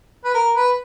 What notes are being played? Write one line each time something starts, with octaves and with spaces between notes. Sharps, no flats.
B4
A#4
B4